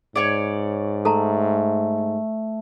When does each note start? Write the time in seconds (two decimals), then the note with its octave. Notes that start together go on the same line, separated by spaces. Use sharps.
0.16 G#2 C#5 D5
1.05 A3 A4 A5 A#5